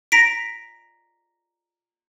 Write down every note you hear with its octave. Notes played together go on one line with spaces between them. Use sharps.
A#5 A#6 B6 D7